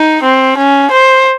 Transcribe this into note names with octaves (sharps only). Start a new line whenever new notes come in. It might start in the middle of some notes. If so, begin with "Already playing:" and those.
Already playing: D#4
C4
C#4
C5